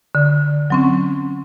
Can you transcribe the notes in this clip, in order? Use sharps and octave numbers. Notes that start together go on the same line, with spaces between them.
D3
F#3 C4 C#4